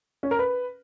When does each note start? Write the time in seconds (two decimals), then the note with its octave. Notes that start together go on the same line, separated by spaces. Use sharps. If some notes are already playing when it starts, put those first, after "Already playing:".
0.23 C#4
0.31 A#4
0.39 B4